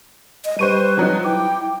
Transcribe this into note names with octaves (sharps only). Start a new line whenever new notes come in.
D#5
G3 B4 C5 C#6 D#7
F3 F#3 D#4
E4 G5 D6